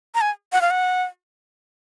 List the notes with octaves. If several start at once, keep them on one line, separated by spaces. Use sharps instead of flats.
A#5
G#5
F#5
F5
F#5